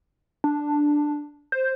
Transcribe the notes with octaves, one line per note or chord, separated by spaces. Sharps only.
D4
C5